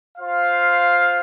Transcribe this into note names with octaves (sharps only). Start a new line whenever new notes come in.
F4 C5 F5